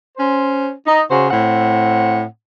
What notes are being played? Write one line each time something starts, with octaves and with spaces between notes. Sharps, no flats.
C#4 C5
D#4
C#3 F#4 C5
A2 C4 F#5